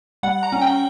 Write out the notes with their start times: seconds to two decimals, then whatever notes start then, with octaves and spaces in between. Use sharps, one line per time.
0.23 G3 F#5
0.43 A#5
0.52 C#4
0.61 G5